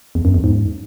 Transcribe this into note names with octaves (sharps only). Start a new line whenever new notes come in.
E2
F#2
E2
G#2